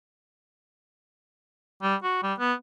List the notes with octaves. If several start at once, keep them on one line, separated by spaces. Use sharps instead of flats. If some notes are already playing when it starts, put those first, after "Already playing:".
G3
F#4
G3
B3